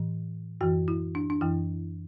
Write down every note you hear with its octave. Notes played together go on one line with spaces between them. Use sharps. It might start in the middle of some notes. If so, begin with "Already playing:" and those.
Already playing: A2 E3
F#2 E3 F#4
E4
D4
D4
F#2 E3 E4